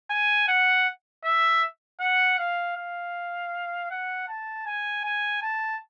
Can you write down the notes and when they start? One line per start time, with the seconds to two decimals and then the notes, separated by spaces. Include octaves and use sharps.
0.10 G#5
0.48 F#5
1.25 E5
2.00 F#5
2.38 F5
2.76 F5
3.91 F#5
4.28 A5
4.66 G#5
5.04 G#5
5.42 A5